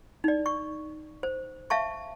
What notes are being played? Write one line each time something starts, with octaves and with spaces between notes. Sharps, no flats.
D#4 D5
C#6
C5
E5 F5 A5 C#6